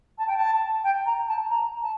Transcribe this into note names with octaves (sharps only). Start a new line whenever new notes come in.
A5
G5
A5
G5
A#5
A5
A#5
A5